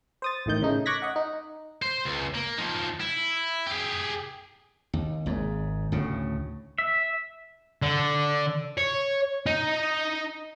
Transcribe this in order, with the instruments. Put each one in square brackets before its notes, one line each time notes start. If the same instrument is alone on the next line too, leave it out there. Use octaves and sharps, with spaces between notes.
[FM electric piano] C5 D#6 A6
A1 A2 D#3 G6
C#3 A3 D#4
C#6 D6 F#6 G#6 A#6 B6
D#5 F#5
D#4
[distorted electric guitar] C5
C#2
A#3
F3 D#4
E4
G4 G#4
[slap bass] D#2
G#1 G#2
D2 A2 C#3
[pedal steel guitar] E5
[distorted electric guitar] D3
C#5
D#4